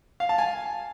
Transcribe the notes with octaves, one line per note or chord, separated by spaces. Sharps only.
F5
A5
G#5